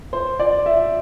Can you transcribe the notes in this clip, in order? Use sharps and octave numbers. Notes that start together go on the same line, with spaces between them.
C5
D5
E5